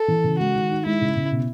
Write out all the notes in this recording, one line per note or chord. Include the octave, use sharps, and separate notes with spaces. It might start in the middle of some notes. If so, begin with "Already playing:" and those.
Already playing: A4
E3
C#3
G#3 F#4
D#3
D#4
G#3 E4
C#3
C#3
B2